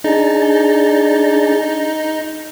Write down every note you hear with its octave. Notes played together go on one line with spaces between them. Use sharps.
D4 D#4 G#4 A5